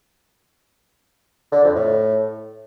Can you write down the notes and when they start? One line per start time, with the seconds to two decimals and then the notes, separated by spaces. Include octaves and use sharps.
1.52 D3
1.64 F2
1.75 A2